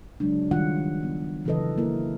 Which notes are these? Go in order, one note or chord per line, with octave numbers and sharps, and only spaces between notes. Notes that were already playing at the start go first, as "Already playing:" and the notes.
C#3 F#3 G#3 D4
D#3 G3 F4 F#5
B3
C#3 E3 F#3 A4 B4 D#5
A#3 E4 A#4